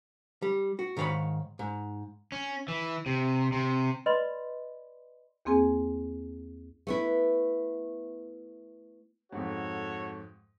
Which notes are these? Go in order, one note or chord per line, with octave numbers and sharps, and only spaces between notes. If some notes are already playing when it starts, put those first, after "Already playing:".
G3
F#4
G#2 D#3 C#5 F5 B5
G#2
C#4
E3
C3
C3
B4 D5 D#5 B5 C6
E2 A#3 C4 G#4 G#5
A3 B3 E4
F2 G#2 F#4 A4 C#5